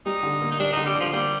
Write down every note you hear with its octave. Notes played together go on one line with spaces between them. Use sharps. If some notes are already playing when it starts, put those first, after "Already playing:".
G3 D#4
D3
A#3
D#4
G3 D4
D3 D#4
G3
D3 F3
G3 A#3